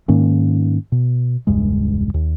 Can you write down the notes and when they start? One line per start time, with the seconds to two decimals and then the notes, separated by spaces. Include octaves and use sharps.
0.08 G#2 D#3 A#3 C#4
0.92 B2
1.47 E1 C#2 G2 G#3
2.14 D#2